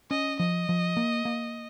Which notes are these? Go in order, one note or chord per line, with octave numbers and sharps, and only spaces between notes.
C#4 D#5
F3 D#5
F3
A#3
A#3